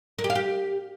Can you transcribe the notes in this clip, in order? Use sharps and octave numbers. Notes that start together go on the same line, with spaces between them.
A#4
G4
F5
G4